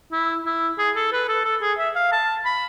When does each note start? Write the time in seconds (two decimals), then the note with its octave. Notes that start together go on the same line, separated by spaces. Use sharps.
0.12 E4
0.46 E4
0.78 G#4
0.96 A4
1.12 B4
1.28 A4
1.45 A4
1.61 G#4
1.78 E5
1.95 F5
2.12 A5
2.45 B5